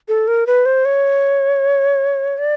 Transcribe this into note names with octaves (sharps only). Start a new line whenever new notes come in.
A4
A#4
B4
C5
C#5
D5